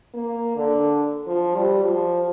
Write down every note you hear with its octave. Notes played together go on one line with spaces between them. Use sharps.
A#3
D3
F3
G3
F3